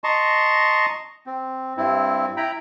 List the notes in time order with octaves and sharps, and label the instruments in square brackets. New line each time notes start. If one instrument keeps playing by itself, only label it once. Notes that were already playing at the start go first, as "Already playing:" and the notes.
[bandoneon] D#5 A5 A#5 C6 C#6
C4
G2 C4 E4
E4 G5 A#5 B5